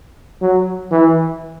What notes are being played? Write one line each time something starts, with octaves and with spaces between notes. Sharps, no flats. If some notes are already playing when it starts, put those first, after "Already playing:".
F#3
E3